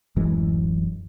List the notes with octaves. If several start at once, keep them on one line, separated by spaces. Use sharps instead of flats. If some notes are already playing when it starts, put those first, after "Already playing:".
D1 F#2 E3 G#3